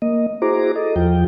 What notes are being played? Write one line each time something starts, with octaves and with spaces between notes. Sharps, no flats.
A#3 D#5
E4 F#4 G#4 C5 A#5 D6
A4 D#5
E2 F3 F4 G5